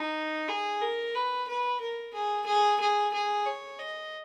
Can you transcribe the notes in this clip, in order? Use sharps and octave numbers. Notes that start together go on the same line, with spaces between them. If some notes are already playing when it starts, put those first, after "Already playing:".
Already playing: D#4
G#4
A#4
B4
B4
A#4
G#4
G#4
G#4
G#4
C#5
D#5